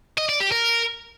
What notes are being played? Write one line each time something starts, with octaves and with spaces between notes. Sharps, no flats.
D#5
D5
G4
A#4